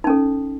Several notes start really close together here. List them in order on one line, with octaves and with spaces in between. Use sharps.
D#4 C#4 A4